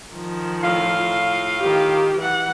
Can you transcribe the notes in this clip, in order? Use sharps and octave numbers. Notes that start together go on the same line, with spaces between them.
D#3 F3
A2 F4 F5
D#3 G4
E3 F#5